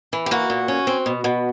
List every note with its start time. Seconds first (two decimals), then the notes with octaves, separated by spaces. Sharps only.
0.13 E3
0.26 G4
0.31 A#3 F#4
0.50 A#2
0.68 C#4
0.87 C4
1.06 B2
1.24 B2